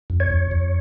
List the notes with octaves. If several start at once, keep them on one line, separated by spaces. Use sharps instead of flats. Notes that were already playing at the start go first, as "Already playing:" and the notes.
F2
C#5
F2
F2